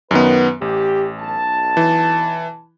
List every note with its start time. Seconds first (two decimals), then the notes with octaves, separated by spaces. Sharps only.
0.11 F#2 D#3 B3 B4
0.61 A1 G4
1.20 B1 A5
1.77 E3